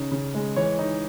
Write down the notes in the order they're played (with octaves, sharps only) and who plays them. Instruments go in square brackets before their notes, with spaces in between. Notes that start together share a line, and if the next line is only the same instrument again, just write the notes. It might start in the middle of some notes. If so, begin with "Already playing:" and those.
Already playing: [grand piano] C#3 C#4 D#4
C#3
G#3
E3 C#5
D#4